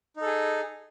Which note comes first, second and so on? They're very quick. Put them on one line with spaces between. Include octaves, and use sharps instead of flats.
D#4 A4 G#4